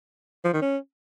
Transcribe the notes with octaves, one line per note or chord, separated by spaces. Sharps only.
F3
D#3
C#4